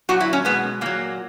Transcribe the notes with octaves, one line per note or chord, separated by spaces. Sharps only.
A#2 F#3 F#4
E4
C#4
B2 G#3 B3
A#2 F#3 A#3